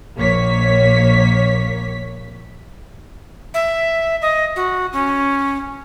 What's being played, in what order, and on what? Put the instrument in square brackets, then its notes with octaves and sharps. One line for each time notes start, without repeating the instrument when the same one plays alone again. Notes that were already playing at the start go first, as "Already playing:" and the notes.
[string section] A#1 A#3 C#5 B6
[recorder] E5
D#5
F#4
C#4